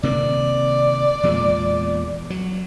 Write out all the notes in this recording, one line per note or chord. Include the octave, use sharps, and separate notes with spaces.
C3 D#3 A#3 D5
E2 A#2 G#3
F#3